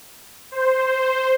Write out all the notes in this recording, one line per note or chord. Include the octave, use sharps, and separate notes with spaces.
C5